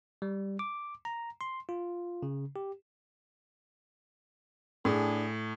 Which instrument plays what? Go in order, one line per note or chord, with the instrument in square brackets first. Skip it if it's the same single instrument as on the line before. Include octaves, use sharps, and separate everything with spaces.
[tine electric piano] G3
D6
A#5
C6
F4
C#3
G4
[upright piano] A2 [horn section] D4 G#4